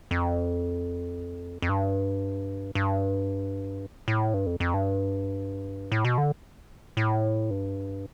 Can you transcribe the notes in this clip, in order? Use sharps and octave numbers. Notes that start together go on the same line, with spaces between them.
F2
F2
G2
G2
A2
G2
F2
F2
G2
A2
B2
D3
A2
G2